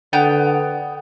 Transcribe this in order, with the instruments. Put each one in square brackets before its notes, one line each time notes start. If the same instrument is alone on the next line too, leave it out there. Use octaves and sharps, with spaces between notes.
[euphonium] D3 [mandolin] B3 G5